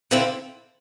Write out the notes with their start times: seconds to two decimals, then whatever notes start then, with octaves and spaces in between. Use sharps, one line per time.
0.11 D3 F3 C4 E4